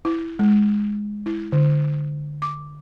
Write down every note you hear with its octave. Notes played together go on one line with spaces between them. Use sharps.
E4
G#3
E4
D3
D6